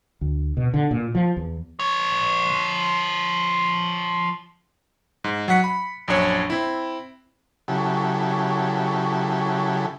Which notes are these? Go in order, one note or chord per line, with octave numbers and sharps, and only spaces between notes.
D2
B2
D3
A#2
F3
E2
F3 C#5
G#2
F#3 F#5 B6 C#7
B5
A#1 F#2 D4 C#5
C4 E4
C#3 F#3 E4 G4 A4